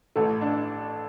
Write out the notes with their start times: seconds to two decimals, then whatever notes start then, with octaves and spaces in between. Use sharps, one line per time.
0.16 A1 A3 A4
0.41 D4